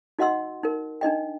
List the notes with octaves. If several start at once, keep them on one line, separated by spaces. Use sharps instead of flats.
D#4 F#4 D#5 F#5 C6 E6
D#4 A#4
D4 D#4 D#5 G5